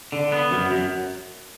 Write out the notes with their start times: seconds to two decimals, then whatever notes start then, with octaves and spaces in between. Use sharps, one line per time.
0.12 D3
0.32 B3
0.51 F#2
0.71 F#2